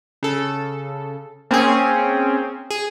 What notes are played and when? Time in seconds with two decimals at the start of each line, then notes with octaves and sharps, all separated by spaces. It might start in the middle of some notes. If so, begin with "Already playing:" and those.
0.23 C#3 A4
1.51 A#3 C4 C#4 G#4
2.70 G#4